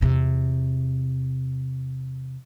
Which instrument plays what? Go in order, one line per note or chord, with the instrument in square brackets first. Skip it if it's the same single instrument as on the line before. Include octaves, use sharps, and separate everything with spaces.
[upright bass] E2 C3